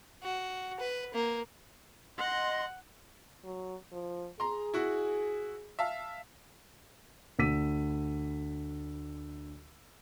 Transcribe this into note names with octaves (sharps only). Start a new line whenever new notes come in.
F#4
B4
A#3
D#5 F#5 C6
F#3
F3
G#4 A#5 C6
E4 F#4
E5 F5 A5
D2 E6 B6 D#7